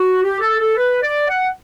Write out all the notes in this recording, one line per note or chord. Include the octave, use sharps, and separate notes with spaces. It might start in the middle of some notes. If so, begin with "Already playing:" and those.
Already playing: F#4
G4
A4
A4
B4
D5
F#5